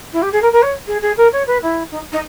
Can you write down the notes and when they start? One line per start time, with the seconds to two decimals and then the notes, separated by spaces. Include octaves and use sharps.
0.12 E4
0.22 G4
0.32 G#4
0.42 A#4
0.52 A#4
0.62 C#5
0.87 G#4
1.01 G#4
1.17 A#4
1.32 C#5
1.47 B4
1.62 E4
1.91 D#4
2.12 D#4